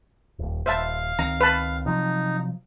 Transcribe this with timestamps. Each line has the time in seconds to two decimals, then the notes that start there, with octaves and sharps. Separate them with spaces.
0.39 D#1 D#2
0.66 D#1 C5 E5 F5 A5
1.19 C#2 D#3 C4 A#5
1.41 B4 A5
1.86 C3 F3 F#3 D#4